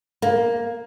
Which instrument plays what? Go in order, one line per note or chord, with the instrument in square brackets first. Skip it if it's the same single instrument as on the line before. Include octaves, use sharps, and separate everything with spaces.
[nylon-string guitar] A#3